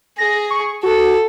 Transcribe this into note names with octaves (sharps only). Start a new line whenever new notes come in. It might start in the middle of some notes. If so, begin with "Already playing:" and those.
G#4 A#6
C#6
F#4 A4